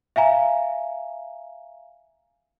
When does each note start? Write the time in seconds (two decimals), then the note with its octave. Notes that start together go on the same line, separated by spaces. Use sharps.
0.16 E5 F5 G#5 A#5